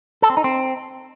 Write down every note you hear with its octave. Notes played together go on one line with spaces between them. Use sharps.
A4
C4
D#4
C4